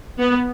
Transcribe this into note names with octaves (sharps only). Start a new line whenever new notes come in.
B3